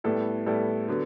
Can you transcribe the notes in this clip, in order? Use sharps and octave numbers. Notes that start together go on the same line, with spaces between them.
A2 G3 B3 E4 A4
A2 G3 B3 E4 A4
D3 F#3 B3